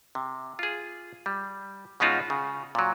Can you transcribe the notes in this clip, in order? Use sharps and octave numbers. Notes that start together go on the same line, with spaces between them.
C3
F4 G#4
G3
B2 G#3 C#4 D#4 F4 F#4
C#3
A#2 F#3